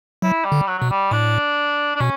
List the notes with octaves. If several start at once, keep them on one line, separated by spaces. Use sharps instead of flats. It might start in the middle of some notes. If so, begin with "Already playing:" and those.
F#3 E4
G3
D3
F#3
B2 F#3
G3
A2 D4
D4
B2 C#4